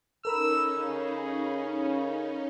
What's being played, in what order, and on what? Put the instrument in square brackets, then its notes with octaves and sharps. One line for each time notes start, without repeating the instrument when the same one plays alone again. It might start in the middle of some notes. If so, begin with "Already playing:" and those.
[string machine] C#4 D#4 [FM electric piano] A4 A#4 B5 [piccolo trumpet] E6
[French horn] C#3 [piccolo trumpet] G#4